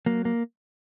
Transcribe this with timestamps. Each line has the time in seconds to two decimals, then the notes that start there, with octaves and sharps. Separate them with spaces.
0.06 F#3 A#3
0.25 A#3